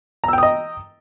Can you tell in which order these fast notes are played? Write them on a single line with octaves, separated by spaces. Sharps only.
A#5 E6 G5 D#6 D#5